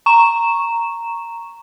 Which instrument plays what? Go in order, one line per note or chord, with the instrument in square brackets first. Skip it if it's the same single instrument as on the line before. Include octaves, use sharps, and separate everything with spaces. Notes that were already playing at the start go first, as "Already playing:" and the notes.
[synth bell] A#5 C#6 E7